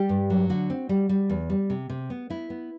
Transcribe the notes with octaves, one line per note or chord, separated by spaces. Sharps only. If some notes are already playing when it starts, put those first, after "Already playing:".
Already playing: G3 G4
G2
F#3
D3 F#4
C4
G3
G3
E2
G3
C3
C3
B3
B3 E4
B3